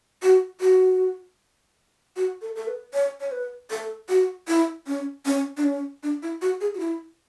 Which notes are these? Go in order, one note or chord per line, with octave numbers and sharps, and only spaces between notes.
F#4
F#4
F#4
A4
A4
B4
C#5
C#5
B4
A4
F#4
E4
C#4
C#4
D4
C#4
D4
E4
F#4
G#4
F#4
E4